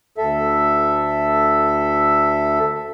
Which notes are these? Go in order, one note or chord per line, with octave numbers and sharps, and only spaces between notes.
D2 A4 E5